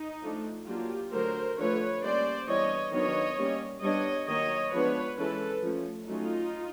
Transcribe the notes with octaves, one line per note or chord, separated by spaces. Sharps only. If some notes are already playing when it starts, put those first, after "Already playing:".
Already playing: D#4
F3 A3 D4
F#3 A#3 D4 F4 G4
D3 F#3 A3 A#4 C5
D3 F3 A3 B4 C#5
G3 A#3 C#4 C5 D5
E3 G3 B3 D4 C#5 D#5
D#3 F#3 B3 D4 C#5 D#5
G3 A#3 C#4
G3 B3 D4 C#5 D#5
D#3 F#3 A#3 C#5 D#5
F3 G#3 B3 D4 B4 C#5
E3 G#3 C#4 A4 B4
F3 A3 C#4
F#3 A3 C#4 D#4 F4